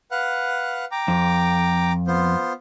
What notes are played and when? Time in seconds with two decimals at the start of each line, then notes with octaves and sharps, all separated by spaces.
0.11 B4 F5 F#5
0.92 G5 A#5 D6
1.08 F2
2.08 B3 F4 C5